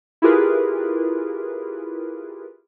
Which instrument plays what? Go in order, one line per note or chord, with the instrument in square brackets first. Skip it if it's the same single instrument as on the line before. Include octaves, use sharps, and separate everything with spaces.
[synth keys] E4 F4 G4 G#4 A#4 B4